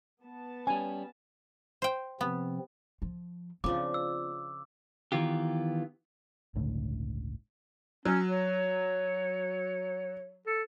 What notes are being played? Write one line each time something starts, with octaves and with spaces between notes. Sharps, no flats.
B3 A5
G3 C#4 G#5
C5 G5
C3 F3 B3 C4
F3
C#3 F3 C4 D4 D6
E6
D#3 E3 B3 F4 G4
G1 C#2 A2 D3
F#3 C#4
C#5
A4